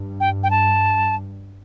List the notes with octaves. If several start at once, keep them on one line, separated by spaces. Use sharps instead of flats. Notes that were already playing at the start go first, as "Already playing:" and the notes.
Already playing: G2
G5
G5
A5